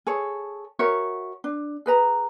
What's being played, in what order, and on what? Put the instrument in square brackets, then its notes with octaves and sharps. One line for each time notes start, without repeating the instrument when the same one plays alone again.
[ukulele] G#4 A4 C#5
F#4 A#4 C#5 E5
D4
G#4 B4 A#5